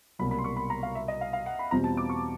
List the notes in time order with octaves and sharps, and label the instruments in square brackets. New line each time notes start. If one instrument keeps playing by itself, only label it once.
[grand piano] C2 B2 F#3 A#3 [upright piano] B5
[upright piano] B5
C6
C#6
B5
A#5
F5
E5
D#5
F5
F5
F#5
B5
[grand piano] E2 B2 G3 C4 F4 [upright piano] A#5
[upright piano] A5
D6
C#6